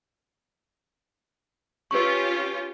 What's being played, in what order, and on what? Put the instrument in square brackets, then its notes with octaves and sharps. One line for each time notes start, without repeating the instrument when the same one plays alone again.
[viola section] C#4 F4 G4 [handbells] B4 C#6